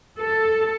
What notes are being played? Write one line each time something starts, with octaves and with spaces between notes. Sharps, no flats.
A4